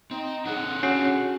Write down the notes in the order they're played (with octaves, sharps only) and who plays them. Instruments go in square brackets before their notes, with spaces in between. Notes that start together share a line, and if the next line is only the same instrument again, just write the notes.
[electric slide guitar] C4 [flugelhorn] D#4
[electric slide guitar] D4 G#4 A4 [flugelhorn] F#5
[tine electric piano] C#4 [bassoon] F#4